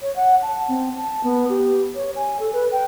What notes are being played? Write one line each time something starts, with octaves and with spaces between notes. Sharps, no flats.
C#5
F#5
A5
C4
A5
B3
G4
C#5
G#5
A4
B4
G5